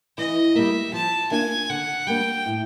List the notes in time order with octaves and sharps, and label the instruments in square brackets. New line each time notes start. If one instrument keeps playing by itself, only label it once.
[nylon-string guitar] E3 [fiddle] D#5
[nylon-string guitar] G3 A#3 [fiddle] E5
[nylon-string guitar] F3 [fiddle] A5
[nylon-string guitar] A#3 D4 F4 [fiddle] G#5
[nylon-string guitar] D3 [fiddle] F#5
[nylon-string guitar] G3 A#3 D4 [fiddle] G5
[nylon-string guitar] A2